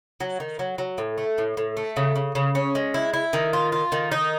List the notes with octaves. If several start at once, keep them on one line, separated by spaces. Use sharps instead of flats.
F#3
D#3
F#3
F#3
A2
A3
A2
A2
A3
C#3
C#3
C#3
C#4
G#3
E4
E4
D#3
F4
F4
D#3
D#4